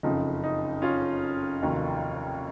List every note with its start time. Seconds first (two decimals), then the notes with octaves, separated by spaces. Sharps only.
0.03 F#1 F2 C#3 F3 D#4
0.44 D#4
0.82 C#4 F4
1.61 F1 D#2 D#3 F#3